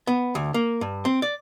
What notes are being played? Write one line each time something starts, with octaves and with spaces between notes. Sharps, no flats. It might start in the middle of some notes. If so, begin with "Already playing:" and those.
B3
D2
A#3
G2
C4
D5